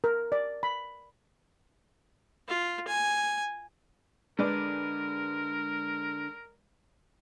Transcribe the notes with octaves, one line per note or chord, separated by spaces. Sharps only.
A#4
D5
B5
F4
G#5
D3 G#3 A#4 B4 D5